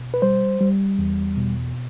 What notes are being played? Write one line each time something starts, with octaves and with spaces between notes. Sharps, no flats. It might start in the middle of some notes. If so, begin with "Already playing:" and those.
Already playing: B2
B4
G3 C5
G3
E2
B2